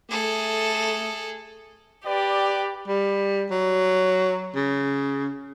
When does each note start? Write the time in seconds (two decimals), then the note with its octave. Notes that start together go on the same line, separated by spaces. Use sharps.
0.10 A3 G#4 A4
2.06 G4 B4 D5
2.88 G3
3.51 F#3
4.56 C#3